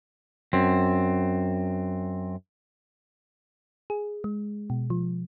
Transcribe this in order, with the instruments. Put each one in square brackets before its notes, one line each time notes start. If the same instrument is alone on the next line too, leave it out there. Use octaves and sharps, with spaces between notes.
[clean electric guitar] F#2 C4
[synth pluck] G#4
G#3
B2
F3